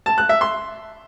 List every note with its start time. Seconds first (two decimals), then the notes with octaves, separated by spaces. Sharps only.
0.06 A5
0.18 F#6
0.29 E5
0.41 C6